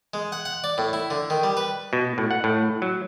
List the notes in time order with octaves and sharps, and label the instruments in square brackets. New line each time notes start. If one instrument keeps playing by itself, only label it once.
[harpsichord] G#3
F#5
F#5
D5
A2
E4
D3
D#3
G3
B4
[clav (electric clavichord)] B2
A2
F#5
A2
F#3